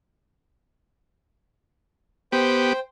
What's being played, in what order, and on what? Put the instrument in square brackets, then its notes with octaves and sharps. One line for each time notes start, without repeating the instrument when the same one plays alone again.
[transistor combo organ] B3 G4 [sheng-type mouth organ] C5 G5